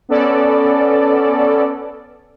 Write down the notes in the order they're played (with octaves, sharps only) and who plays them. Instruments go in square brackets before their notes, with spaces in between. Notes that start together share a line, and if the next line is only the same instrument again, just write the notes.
[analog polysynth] B3 C#4 A4 D5